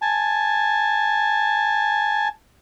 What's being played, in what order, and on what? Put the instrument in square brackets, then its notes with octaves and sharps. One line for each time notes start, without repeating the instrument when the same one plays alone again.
[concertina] G#5 A5